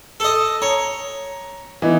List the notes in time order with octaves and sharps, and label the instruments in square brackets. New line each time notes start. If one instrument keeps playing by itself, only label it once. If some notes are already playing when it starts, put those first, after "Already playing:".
[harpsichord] A4 D#5
[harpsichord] C#5 [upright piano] A#5
[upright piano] E3 B3 D#4